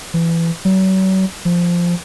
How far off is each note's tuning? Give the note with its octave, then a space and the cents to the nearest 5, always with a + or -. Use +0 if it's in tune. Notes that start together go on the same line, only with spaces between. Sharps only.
E3 +20
F#3 +40
F3 -5